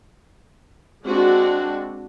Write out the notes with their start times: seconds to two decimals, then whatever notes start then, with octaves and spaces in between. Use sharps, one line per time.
1.04 G#3 C4 D4 F#4